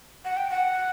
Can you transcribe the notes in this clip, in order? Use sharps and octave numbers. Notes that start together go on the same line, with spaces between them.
F#5
G5
F#5